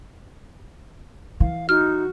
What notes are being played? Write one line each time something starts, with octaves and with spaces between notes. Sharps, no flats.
E3 F5
D#4 F#4 F6